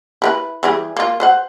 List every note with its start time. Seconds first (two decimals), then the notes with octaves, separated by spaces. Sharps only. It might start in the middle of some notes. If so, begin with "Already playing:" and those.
0.22 E4 A#4 B4
0.63 E3 G3 G#4
0.97 A#3 F4
1.20 B4 C5 F#5